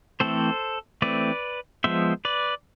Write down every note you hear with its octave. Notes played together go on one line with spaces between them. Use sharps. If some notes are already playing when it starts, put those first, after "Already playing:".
E3 A3 C4 A4 C5
E3 A3 C4 B4 D5
F3 G#3 B3 C5 E5
B4 D5